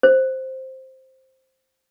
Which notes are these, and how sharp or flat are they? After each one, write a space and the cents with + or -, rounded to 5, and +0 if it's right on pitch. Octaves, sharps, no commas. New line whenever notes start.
C5 +5